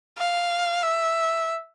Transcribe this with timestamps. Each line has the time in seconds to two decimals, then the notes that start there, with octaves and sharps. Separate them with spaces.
0.18 F5
0.83 E5